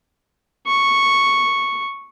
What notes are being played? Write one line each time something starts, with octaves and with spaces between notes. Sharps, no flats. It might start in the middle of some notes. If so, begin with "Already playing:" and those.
C#6